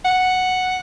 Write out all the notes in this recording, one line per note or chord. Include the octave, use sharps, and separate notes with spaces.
F#5